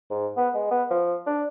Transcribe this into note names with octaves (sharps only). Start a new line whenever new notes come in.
G#2
B3
G#3
B3
F3
D4